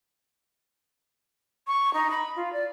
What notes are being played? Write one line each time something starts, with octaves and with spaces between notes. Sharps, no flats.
C#6
D#4
B5
F4
D5